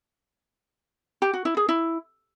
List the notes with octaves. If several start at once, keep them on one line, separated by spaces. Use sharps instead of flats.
G4
F#4
E4
G#4
E4